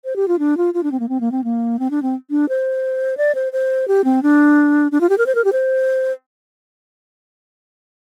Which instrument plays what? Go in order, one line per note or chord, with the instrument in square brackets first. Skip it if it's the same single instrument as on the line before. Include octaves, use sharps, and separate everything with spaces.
[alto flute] C5
G4
F4
D4
F4
F4
D4
C4
A#3
C4
A#3
C4
A#3
C4
D4
C4
D4
C5
D5
C5
C5
G4
C4
D4
D4
F4
G4
A#4
C5
A#4
G4
C5